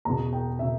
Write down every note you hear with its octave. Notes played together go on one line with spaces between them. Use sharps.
E2 B2 A#5
G5
B2 E5